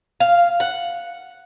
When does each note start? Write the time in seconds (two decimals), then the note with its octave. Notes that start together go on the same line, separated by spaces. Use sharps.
0.20 F5
0.60 F#5